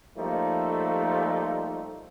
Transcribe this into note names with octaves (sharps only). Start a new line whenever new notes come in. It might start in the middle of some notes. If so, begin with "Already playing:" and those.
F3 G3 A3 A#3 D#4